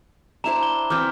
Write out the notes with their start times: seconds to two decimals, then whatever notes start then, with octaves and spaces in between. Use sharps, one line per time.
0.44 D4 E4 C5 A#5 E7 F7
0.63 G7
0.90 E3 C4 D6 F6 G6